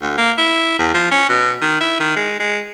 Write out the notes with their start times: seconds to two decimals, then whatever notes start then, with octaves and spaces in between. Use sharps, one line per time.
0.02 D2
0.18 A#3
0.38 E4
0.79 E2
0.94 F3
1.11 C#4
1.29 B2
1.61 D#3
1.80 E4
2.00 D#3
2.16 G#3
2.39 G#3